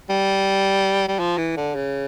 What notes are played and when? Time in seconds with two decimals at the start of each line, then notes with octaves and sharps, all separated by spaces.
0.10 G3
1.08 G3
1.19 F3
1.38 E3
1.56 D3
1.75 C#3